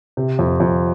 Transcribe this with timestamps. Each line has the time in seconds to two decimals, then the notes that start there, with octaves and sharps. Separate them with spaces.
0.17 C3
0.39 F2
0.60 F2